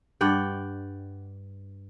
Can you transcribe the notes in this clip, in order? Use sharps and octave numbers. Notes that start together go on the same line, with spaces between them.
G2 D5 F#5 G5